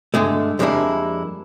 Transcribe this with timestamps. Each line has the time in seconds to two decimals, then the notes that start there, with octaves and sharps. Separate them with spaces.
0.14 G2 D3 G#3 A3
0.59 F2 G3 G#3 A#3 D4 E4